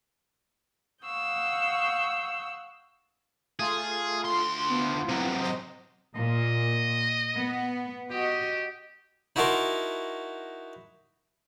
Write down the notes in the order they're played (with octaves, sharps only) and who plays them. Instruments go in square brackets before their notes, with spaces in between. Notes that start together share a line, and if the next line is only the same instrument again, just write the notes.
[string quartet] F5 F#5 C#6 D#6 E6 G6
[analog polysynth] A3 F4 [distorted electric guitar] G#4
[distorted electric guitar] D2 C6
[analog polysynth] B3 E4 F4
[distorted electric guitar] C3 F#3
[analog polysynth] C5 D#5
[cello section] A#2 [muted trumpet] D#5
[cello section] B3
[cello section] F#4 D#5 [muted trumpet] G4
[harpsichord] D#4 E4 F#4 A#4 A5 C6